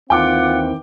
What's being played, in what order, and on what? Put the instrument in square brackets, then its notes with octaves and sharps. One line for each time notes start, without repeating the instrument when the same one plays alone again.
[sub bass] D#2 [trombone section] D#3 E3 C4 [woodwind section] F4 F#5 [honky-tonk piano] G5 D6